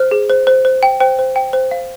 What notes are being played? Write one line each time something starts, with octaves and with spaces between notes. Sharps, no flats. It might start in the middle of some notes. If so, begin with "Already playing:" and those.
Already playing: C5 F6
G#4
C5
C5
C5
G5
C5 G5
C5
G5
C5
F5